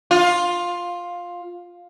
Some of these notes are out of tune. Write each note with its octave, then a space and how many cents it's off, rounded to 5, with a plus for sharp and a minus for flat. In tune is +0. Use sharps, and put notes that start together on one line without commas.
F4 +10